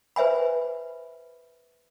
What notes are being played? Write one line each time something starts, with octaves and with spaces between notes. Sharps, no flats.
B4 C5 E5 G#5 B5